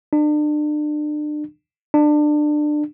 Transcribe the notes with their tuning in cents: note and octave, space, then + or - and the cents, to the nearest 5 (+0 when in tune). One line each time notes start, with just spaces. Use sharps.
D4 +35
D4 +25